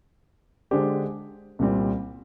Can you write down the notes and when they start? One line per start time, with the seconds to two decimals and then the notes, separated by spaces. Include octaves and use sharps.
0.71 D3 G#3 D4 G4 C5
1.59 C2 A#2 G3 C4